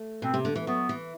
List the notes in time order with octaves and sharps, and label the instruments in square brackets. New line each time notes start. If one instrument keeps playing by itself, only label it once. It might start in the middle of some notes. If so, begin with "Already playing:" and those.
Already playing: [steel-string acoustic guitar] A3
[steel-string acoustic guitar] B2 [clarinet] C4
[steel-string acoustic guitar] C3
D3
E3
[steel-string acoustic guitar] F#3 [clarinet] B3
[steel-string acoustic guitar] E3